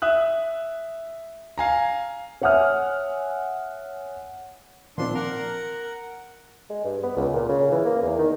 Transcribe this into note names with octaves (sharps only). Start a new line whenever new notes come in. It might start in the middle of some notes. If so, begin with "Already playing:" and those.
E5 D#6 F#6
F5 G#5 A#5
C#5 E5 F#5 G#5 D#6 F6
A#2 D#3 F3 C4 D4 C6
A#4 F#5
G#3
G2
B3
C#2
A#2
C#3
E3
A#3
E2
D#3